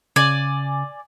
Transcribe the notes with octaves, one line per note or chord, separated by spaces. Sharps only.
C#3 D5 G#5